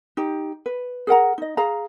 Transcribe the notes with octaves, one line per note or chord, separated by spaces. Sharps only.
D#4 G4
B4
G#4 A#4 F#5 A#5
D#4 D#5
G#4 F5 A#5